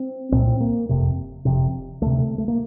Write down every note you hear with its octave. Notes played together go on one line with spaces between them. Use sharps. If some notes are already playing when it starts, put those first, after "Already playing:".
Already playing: C4
C2 A#2 C4
A#3
F1 F2 C3
F1 F2 C3
D2 C3 A3
A3
A#3